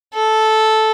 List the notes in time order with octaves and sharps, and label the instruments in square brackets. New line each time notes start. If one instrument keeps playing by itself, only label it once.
[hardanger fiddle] A4